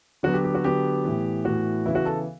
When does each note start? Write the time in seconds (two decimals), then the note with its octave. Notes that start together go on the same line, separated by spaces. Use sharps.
0.23 D3 F#3 B3 F#4
0.34 G4
0.44 G4
0.55 F#4
0.64 D3 F#3 B3 G4
1.04 A2 E3 B3
1.45 A2 E3 B3 F#4
1.86 C#3 E3 B3 E4
1.95 F#4
2.05 A4